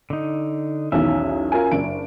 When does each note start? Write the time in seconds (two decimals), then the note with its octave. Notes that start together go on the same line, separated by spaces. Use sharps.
0.10 D3 D#4
0.92 B1 E2 D#3 C#4 E5
1.52 F4 A#4 G#5
1.71 F#1 D4 D7